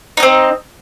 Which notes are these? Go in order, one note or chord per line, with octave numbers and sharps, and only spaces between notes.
C4 D#4 D#5